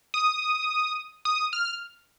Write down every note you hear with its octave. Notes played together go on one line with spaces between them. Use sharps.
D#6
D#6
F6